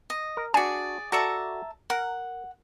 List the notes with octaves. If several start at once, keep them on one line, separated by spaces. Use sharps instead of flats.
D#5
A#4
D4 F#4 G#4 D5 G#5
F#4 A4 D5 E5 A5 A#5
A#4 F#5